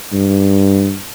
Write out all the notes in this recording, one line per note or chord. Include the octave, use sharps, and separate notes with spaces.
G2